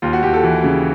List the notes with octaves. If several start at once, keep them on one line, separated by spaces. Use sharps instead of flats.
D#2 F4
F#4
D#2 G4
A4
E3
C#3